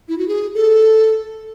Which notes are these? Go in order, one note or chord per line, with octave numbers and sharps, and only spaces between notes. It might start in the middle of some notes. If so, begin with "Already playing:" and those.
E4
F#4
G#4
A4